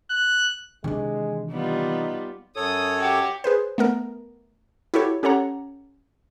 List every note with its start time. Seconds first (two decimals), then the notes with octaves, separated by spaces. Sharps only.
0.10 F#6
0.84 C3 D#3 E3 G#3 C#4 D4
1.51 G3 B3 D#4 F4
2.56 F#2 A4 C#5 D#6
2.98 F#4 G4
3.44 G#4 B4 C5
3.78 A3 B3 A#4
4.94 E4 F#4 G4 A4 C#5
5.23 C#4 G4 A4 C#5 F#5 A#5